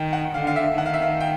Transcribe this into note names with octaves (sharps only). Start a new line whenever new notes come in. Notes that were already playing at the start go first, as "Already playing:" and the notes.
Already playing: D#3 G5
F#5
D3 F5
F5
E5
D#3 F#5
F5
E5
F5
G5